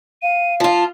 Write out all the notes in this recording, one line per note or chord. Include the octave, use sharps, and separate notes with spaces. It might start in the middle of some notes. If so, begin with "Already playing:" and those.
F5 D#7
F3 F4 A5